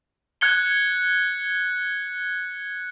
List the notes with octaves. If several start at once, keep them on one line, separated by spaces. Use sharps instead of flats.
F#6 G#6 C#7 G7